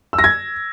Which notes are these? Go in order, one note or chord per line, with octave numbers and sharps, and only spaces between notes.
E6
A#6
G#6